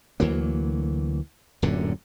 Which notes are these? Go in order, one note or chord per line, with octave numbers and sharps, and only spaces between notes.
D2 E3 F#3 A#3
D1 F#2 A#2 D3